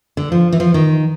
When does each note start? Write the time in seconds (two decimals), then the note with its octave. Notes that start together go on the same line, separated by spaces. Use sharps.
0.17 D3
0.32 F3
0.52 E3
0.60 F3
0.74 D#3